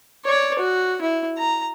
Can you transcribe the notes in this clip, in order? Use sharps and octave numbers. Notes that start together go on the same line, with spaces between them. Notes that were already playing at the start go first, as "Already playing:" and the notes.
C#5 D5
F#4
E4
A#5